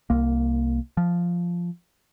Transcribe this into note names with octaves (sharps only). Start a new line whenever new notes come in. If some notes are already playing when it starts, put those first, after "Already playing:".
C2 A#3
F3